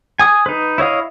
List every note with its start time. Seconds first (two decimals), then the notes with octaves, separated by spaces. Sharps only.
0.19 G#5 D#6
0.46 D#4 B4
0.78 E4 C#5 D#5 F5